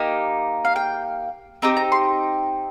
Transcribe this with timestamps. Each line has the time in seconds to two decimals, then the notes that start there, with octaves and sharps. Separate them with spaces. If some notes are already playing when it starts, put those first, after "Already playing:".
Already playing: A#3 D#4 G4
0.65 F5
0.76 G5
1.62 C4 D#4 G4 A#5
1.77 A#5
1.92 C6